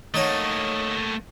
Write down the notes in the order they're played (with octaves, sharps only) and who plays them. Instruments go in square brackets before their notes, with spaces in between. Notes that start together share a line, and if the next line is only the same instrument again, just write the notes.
[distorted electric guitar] A3 A#3 [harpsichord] D#4 C#5 F#5